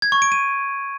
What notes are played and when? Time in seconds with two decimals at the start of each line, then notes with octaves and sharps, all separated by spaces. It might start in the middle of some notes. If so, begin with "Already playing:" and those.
0.02 G#6
0.12 C#6
0.22 D7
0.32 D#7